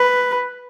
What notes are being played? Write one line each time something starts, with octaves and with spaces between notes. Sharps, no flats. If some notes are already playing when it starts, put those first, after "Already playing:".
Already playing: B4